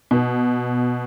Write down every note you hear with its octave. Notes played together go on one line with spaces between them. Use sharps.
B2